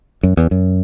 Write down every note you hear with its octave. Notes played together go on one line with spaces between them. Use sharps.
F#2
E2
F#2